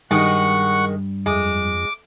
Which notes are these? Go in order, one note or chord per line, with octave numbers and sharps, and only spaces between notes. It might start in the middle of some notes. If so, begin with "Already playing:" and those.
G2 D#3 G#3 F#5 C#6
F2 G#3 D6